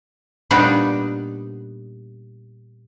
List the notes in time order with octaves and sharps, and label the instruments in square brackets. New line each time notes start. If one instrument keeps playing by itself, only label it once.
[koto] A#2 G3 B3 D4 D#4